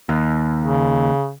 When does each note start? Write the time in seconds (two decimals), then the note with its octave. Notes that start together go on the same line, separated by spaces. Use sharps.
0.09 D#2
0.60 C#3